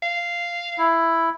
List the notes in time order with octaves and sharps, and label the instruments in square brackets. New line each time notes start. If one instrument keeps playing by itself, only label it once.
[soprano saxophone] F5
[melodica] E4